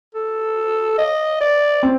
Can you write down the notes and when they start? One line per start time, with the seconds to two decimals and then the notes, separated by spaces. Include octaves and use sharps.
0.15 A4
0.98 D#5
1.41 D5
1.83 C4